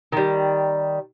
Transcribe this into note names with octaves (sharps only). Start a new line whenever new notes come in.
D#3 G3